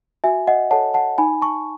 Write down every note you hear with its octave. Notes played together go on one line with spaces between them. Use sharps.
F#4 E5 G#5
D#5 F#5
A4 C#5 F#5 A5
F#5 A5
D#4 G#5 B5
A5 C#6